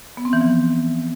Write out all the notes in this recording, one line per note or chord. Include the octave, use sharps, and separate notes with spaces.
B3
C4
E3
F3